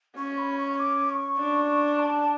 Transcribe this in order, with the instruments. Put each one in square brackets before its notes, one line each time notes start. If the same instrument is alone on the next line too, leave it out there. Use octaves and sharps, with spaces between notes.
[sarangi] C#4 [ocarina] C#6
[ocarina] B5
C#6
C#6
D6
C#6
[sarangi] D4
[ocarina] A5